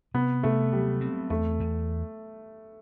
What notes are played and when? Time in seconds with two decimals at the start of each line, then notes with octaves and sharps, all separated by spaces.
0.14 C3 B3
0.43 C3 A3
0.73 F#3 G3
1.01 C4
1.30 E2 A3
1.60 E2